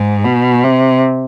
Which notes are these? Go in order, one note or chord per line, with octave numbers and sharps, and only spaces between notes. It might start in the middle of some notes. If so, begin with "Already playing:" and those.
Already playing: G#2
B2
C3